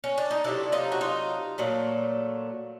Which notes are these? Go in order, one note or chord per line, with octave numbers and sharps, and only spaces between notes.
C#4
D4
D#4
C3 D#3 F#3 A3 D4 E4
D#4 F4
F#4
D#4 F4
A#2 F#3 A3